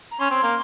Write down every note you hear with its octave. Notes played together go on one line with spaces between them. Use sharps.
A#5
C#4 C6
C4
A#3